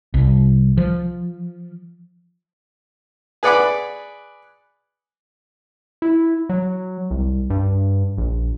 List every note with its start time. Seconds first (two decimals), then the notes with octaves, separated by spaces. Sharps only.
0.14 C2
0.78 F3
3.43 G#4 B4 D5 F#5 B5 D6
6.02 E4
6.49 F#3
7.11 C2
7.50 G2
8.18 A#1